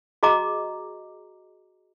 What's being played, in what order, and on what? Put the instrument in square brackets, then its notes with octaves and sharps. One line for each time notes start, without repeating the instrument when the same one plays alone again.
[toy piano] F#4 G#4 D#5 A#5 D6